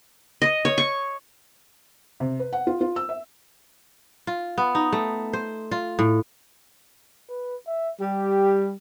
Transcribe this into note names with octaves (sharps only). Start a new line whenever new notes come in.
D#5
C#5
C#6
C3
B4
F#5
F4
F4
E6
E5
F4
B3
D#4
A3
C5
F4
A2
B4
E5
G3 G4